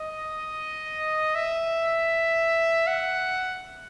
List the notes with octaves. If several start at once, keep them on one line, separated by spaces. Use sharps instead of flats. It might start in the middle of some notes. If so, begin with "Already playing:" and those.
Already playing: D#5
E5
F#5